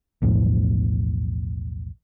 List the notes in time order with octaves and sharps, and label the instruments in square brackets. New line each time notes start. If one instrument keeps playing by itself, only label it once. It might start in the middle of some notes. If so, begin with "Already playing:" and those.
[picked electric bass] B1 E2 A2 F3